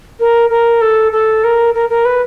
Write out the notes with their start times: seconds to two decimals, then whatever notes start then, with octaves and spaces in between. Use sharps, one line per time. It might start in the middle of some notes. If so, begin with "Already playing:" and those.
0.19 A#4
0.49 A#4
0.81 A4
1.12 A4
1.43 A#4
1.74 A#4
1.89 A#4
2.05 B4